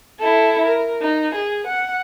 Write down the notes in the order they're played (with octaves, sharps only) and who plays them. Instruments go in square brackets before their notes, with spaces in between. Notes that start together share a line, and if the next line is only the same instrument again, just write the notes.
[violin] E4 A4
A#4
D#4
G#4
F#5